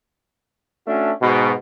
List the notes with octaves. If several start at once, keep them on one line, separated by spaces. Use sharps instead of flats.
A3 C#4 D4 F#4 E5
G#2 B2